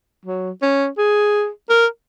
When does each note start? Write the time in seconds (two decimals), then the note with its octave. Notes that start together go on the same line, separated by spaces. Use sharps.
0.26 F#3
0.62 C#4
0.98 G#4
1.70 A#4